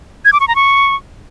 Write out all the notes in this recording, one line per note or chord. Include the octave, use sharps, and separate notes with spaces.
G#6
D6
C#6
A#5
C#6